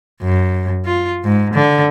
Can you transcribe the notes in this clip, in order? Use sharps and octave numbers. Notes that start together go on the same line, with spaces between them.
F#2
F4
G#2
D3